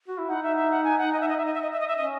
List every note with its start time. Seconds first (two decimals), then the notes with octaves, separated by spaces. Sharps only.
0.08 F#4
0.19 E4
0.29 D#4 F#5
0.43 E5
0.57 E5
0.71 F#5
0.84 G#5
0.98 F#5
1.12 D#5
1.20 E5
1.28 D#5
1.38 E5
1.45 D#5
1.54 E5
1.62 D#5
1.71 E5
1.80 D#5
1.88 E5
1.95 C#4 D#5